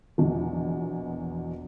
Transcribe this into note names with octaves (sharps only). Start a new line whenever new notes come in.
A#1 E2 B2